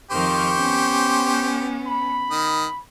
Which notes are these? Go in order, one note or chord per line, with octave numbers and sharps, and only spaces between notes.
F2 D#3 G4 C5 C#6 F6
B3 C#4
B5
D#3 D#6